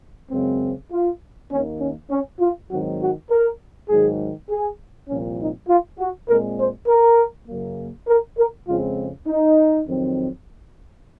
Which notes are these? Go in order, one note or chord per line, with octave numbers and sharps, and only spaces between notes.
F#2 C#3 G#3 C4
F4
D#2 D#3 A#3 C#4
C#4
C#4
F4
G#2 D#3 F#3 C4 F#4
F#4
A#4
G#2 D#3 F#3 G#4
G#4
C2 A#2 F3 C4 C#4
D#4
F4
F#4
A#2 G#3 C4 A#4
C5
A#4
F#2 C#3 F#3 A#3
A#4
A#4
F2 C#3 G#3 C4 F4
D#4
F2 D#3 F#3 C4